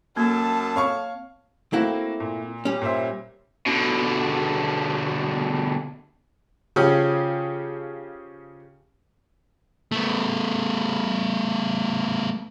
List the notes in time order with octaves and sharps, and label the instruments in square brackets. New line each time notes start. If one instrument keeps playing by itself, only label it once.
[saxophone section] F#2 A4 [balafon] A#3 [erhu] A5
[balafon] C4 [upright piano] C#5 F5 C#6
[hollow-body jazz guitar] A3 C4 E4 [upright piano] A#3 F#4
[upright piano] A#2
[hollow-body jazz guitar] G3 C#4
[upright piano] A#2 C5 E5
[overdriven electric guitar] B2 D3
[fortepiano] C#3 F3 C#4 G4 G#4
[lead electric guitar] A3 B3